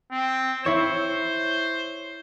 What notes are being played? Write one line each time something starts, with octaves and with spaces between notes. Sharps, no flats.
C4
E4 C5 C#5 E7